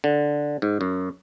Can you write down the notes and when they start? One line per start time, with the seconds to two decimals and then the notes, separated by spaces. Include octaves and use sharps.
0.04 D3
0.62 G#2
0.81 F#2